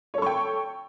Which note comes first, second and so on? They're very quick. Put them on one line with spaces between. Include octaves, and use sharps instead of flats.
C#5 A4 C#6 G5